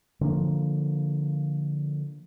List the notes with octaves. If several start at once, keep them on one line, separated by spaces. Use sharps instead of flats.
D3 F3 G#3 A#3